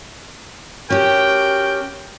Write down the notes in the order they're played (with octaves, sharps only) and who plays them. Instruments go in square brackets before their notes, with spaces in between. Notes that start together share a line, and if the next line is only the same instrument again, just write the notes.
[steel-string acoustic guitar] C#4 G4 [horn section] F#4 A#4 G5